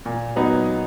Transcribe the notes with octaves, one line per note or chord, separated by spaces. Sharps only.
A#2
F#3 B3 D#4